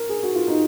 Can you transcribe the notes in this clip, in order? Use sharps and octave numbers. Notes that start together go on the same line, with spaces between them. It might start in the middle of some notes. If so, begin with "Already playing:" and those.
Already playing: A#4
G#4
F#4
F4
D#4